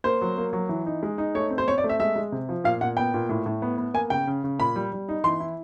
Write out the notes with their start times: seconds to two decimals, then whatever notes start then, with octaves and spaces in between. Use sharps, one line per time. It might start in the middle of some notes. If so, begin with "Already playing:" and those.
0.04 A#3 C5
0.22 F#3
0.38 A#3
0.53 F#3
0.69 E3
0.86 D#4
1.03 G#3
1.18 D#4
1.35 A3 C#5
1.50 C4
1.58 C5
1.68 C4 C#5
1.78 D5
1.84 A3
1.89 E5
2.00 G#3 E5
2.16 G#3
2.32 C3
2.49 F3
2.64 A#2 F5
2.81 A#2 F#5
2.97 B3 G5
3.14 A#2
3.29 A2
3.46 A2
3.62 B3
3.78 B3
3.94 A#3 G#5
4.10 C#3 G5
4.27 C#3
4.44 C#3
4.59 A#2 B5
4.76 G3
4.93 G3
5.09 D#4
5.24 E3 C6
5.40 E4